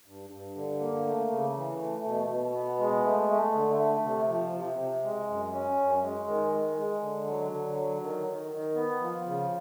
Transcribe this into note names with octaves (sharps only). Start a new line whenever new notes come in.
G2
G2
D3
A#3
A3
C#3
E3
A3
B2
B2
B3
G#3
A3
A3
D3
A3
C3
F3
C3
C3
G#3
F#2
C#4
F#2
G#3
D#3
G#3
G#3
D3
F#3
D3
F#3
D#3
D#3
D#3
B3
F3
C#3